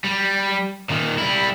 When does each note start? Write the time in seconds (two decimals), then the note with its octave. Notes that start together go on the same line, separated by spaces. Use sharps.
0.04 G3
0.89 A#2 D#3
1.18 G3 E4